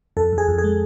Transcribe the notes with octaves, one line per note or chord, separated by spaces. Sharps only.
F2 A4
F2
G#4
F2
G#4
G#3